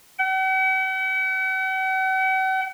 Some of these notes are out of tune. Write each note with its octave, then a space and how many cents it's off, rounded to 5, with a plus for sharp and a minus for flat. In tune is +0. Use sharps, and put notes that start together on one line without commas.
F#5 +45